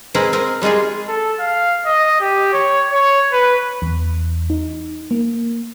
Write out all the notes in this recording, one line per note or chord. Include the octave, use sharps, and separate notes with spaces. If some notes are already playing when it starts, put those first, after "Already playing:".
C4 D#4 G#4 A#4 B4
C4 A#4
G3 G#3 D#4 F4 G#4
A4
F5
D#5
G4
C#5
C#5
B4
E2
D#4
A#3